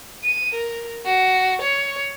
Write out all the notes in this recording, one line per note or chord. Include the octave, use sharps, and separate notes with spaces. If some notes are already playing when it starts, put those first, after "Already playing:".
D#7
A#4
F#4
C#5